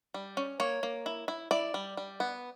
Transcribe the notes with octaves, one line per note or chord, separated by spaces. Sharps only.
G3
C#4
A#3 C#5
A#3
E4
E4
E4 D5
G3
G3
B3